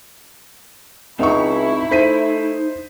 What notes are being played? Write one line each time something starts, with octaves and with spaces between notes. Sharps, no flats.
C#2 C4 D#4 E4 D#5 E5 F#5 C#6
A3 D#4 C5 B6 D#7